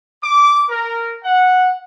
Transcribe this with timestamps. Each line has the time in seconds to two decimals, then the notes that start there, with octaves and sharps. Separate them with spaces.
0.23 D6
0.69 A#4
1.23 F#5